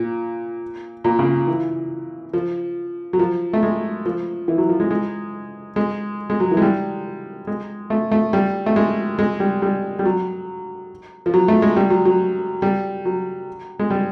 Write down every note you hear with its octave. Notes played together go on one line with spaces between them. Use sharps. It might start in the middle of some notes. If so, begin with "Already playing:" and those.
Already playing: A#2
A#2
C#3
E3
F3
F#3
F3
A3
G#3
F3
E3
F#3
F3
G#3
G#3
G#3
G#3
F#3
E3
G#3
G3
G#3
A3
A3
G3
A3
G#3
G#3
G3
G3
G3
F#3
F3
F#3
A3
G#3
G3
F#3
F#3
G3
F#3
G#3
G3